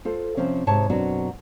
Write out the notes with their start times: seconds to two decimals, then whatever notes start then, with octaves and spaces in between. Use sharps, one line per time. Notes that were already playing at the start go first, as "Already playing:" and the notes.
0.05 F4 A4 C5
0.37 C3 F3 C4 C#4
0.67 G#2 C3 C#5 A5
0.90 F#2 B2 F#3 C4 D4 F#4